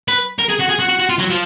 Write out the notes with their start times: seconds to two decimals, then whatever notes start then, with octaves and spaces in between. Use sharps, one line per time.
0.08 B4
0.39 A#4
0.49 G#4
0.59 F#4
0.69 G#4
0.79 F#4
0.89 F#4
1.00 F#4
1.10 F4
1.19 F#3
1.30 F3